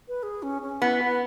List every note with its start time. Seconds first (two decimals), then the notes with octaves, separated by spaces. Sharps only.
0.08 B4
0.23 G#4
0.43 C#4
0.62 C#4
0.82 B3 E4
1.01 B4